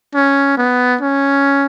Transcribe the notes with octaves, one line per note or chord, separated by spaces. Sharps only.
C#4
B3
C#4